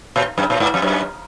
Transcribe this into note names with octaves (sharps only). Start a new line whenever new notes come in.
A#2
F#2
A#2
G#2
F2
F#2